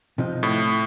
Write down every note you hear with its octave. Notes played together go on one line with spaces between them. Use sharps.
C3 F3 D#4
A2